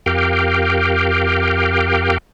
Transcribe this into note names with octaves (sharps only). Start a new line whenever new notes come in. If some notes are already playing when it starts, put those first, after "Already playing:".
F2 G4 A#4 F5 G5